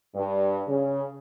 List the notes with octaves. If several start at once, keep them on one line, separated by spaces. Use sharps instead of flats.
G2
C#3